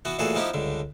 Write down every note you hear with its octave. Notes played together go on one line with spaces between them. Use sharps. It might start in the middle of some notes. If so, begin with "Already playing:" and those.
E3 B3 F#4
A1 A#2 E3 F#4 G#4 A4
F3 B3 D#4 E4 G4
C#2 G2 D3